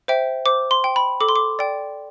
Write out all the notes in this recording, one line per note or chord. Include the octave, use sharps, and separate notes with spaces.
C5 E5 G5
C5 D6
C6
G5
B5
A4 D6
C6
D6
D5 G5